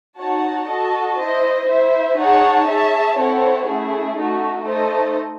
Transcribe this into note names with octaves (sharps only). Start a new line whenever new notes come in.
D#4 F#4 C#5 F#5 A5
F#4 A4 D#5 A5
E4 C5 D#5
E4 C5 E5
D#4 G#4 C#5 F#5 A5
G#4 C#5 E5 A5
C4 E4 A4 C#5 F#5
A3 C#4 E4 G#4
A3 D#4 F#4
A3 D#4 A4 C5 D#5